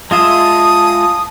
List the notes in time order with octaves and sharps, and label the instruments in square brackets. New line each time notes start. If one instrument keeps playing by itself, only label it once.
[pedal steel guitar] G#3 F4 E5 [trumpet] A5 [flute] D#6